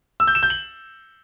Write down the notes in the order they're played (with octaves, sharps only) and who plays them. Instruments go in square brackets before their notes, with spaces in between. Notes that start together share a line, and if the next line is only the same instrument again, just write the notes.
[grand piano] E6
G6
E7
G6
F#7